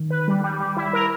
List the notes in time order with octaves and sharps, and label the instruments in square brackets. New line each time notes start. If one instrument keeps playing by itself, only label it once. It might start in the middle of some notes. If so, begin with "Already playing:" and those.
Already playing: [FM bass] D#3
[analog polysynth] B4
G3
G3
G3
E4
A#4